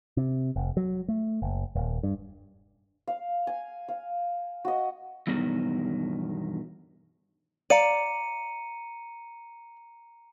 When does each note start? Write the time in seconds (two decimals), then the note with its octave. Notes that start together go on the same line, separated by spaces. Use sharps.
0.17 C3
0.56 F1
0.77 F#3
1.08 A3
1.42 F#1
1.75 D#1
2.03 G2
3.07 F5
3.47 G#5
3.88 F5
4.65 F#4 D#5
5.27 E2 G2 B2 D#3 F#3
7.70 D5 F5 A#5 C#7 D#7